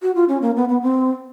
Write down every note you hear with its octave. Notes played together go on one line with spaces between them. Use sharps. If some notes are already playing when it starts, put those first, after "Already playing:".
F#4
F4
C#4
A#3
B3
B3
C4